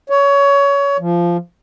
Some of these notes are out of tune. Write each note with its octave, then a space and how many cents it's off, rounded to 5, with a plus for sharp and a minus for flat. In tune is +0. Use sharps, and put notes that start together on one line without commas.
C#5 +20
F3 -15